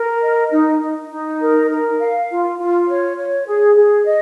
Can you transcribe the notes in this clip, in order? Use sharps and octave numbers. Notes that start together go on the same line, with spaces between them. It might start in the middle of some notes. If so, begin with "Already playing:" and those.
Already playing: A#4
D#5
D#4
D#4
D#4
A#4
A#4
F5
F4
F4
C#5
C#5
G#4
G#4
D#5